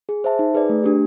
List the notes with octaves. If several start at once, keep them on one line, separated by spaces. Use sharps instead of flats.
G#4
C5 E5 A5
D#4
G#4 B4 D5
A3
D4 G4